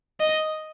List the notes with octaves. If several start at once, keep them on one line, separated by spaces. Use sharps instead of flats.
D#5